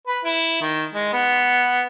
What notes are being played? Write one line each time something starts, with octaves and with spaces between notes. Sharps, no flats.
B4
E4
D#3
G#3
B3